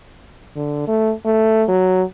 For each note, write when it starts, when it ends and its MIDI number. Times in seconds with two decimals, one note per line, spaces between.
0.56 0.87 50
0.87 1.12 57
1.25 1.63 57
1.68 2.03 54